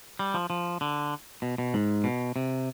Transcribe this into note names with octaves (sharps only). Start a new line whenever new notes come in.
G3
F3
F3
D3
B2
B2
G#2
B2
C3